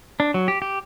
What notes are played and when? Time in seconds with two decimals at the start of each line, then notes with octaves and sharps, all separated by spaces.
0.20 D4
0.34 F#3
0.48 G4
0.62 G4